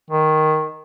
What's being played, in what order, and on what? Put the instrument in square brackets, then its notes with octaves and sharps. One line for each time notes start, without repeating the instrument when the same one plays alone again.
[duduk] D#3